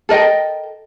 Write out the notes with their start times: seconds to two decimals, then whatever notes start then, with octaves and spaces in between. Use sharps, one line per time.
0.09 A4 A#4 D#5 G5